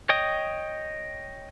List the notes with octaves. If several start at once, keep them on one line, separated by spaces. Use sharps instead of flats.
C#5 D#5 G5 D#6